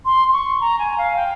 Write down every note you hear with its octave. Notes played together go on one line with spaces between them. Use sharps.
C6
C6
C#6
A#5
G#5
F5
G5